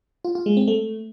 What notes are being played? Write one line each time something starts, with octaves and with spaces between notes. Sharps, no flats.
F4
F4
G#3
C4
A3